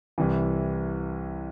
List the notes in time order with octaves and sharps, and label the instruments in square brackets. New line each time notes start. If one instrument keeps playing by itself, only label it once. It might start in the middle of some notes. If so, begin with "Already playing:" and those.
[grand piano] C2 C3 E3